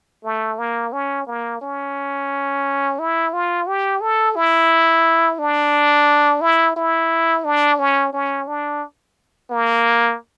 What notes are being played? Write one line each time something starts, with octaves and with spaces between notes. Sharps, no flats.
A3
A#3
C#4
A#3
C#4
E4
F4
G4
A4
E4
D4
E4
E4
D4
C#4
C#4
D4
A#3